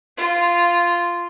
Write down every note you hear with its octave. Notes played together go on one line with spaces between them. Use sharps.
F4